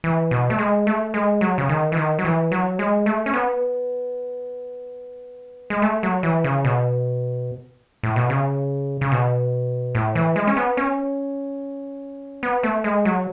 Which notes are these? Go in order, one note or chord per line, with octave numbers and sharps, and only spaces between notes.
E3
B2
A3
G#3
A3
G#3
F#3
C#3
D#3
E3
D#3
F#3
E3
F#3
G#3
A3
C#4
B3
G#3
A3
F#3
E3
C#3
B2
A2
B2
C#3
C#3
B2
A2
E3
G#3
C#4
B3
C#4
B3
A3
G#3
F#3